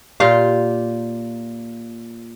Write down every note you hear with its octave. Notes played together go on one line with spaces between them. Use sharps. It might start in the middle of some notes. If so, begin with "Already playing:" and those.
A#2 F4 G4 F5